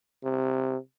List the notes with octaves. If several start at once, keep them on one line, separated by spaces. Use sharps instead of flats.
C3